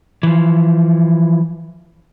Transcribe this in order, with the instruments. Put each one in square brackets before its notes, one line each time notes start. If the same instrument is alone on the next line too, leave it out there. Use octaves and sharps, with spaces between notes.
[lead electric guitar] E3 F3